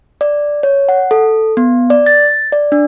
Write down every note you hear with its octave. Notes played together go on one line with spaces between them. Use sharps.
D5
C#5
F#5
A4
B3
D5
A6
D5
D4